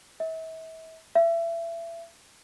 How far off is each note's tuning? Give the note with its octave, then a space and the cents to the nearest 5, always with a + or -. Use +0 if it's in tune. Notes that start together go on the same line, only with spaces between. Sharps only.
E5 -40
E5 +30